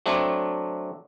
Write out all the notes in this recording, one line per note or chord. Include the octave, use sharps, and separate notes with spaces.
F#3 A3 C4 D4